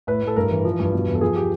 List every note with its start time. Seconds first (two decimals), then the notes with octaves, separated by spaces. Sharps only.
0.07 A2 B4
0.22 A2
0.27 A4
0.36 G2 A#4
0.51 E3
0.65 F3
0.79 G2
0.93 B2
1.07 E2
1.15 A4
1.21 F3 G#4
1.36 G4